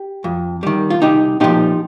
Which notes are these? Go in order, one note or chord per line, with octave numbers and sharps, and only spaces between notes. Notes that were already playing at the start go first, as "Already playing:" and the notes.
Already playing: G4
F2
D#3 G3
F4
C2 D#4 G4
A#2 F3 D#4 G4